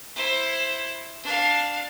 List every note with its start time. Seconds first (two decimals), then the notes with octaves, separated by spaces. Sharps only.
0.15 E4 C5
1.23 D4 F5